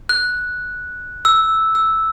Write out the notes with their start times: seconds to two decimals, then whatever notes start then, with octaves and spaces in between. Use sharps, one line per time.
0.09 F#6
1.25 E6
1.75 E6